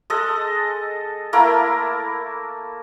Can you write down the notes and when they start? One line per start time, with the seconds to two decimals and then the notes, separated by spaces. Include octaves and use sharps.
0.10 G#3 A4 D#5
1.33 A3 A#3 E4 A#4